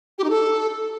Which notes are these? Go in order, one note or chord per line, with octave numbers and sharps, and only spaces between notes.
G4
D#4
A4